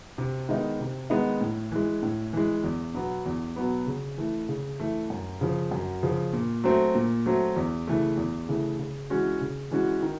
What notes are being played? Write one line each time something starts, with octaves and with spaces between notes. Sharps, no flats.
C3
D#3 G#3 B3 D#4
C3
D#3 G#3 B3 D#4
A2
E3 G#3
A2
E3 G#3
E2
B2 F#3 B3
E2
B2 F#3 B3
C#3
E3 A3
C#3
E3 A3
F#2
C#3 F3
F#2
C#3 F3
A#2
F#3 A3 C4
A#2
F#3 A3 C4
E2
C#3 E3 A3
E2
C#3 E3 A3
C#3
E3 G#3 C#4 F#4
C#3
E3 G#3 C#4 F#4
D#3